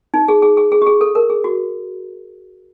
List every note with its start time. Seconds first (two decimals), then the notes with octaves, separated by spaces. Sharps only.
0.14 D#4
0.28 G#4
0.42 G#4
0.57 G#4
0.72 G#4
0.82 G4
0.86 G#4
1.01 A4
1.15 A#4
1.30 G#4
1.44 F#4